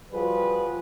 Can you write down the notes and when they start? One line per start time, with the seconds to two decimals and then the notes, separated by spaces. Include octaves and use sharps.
0.13 F3 G3 F4 F#4 G#4 B4